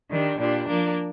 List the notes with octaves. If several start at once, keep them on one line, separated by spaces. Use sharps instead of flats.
D#3 G3 D4
A#2 G3 D4
F3 A#3 D4